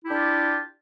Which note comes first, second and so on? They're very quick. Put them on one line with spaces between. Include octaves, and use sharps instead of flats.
E4 G4 D4 F4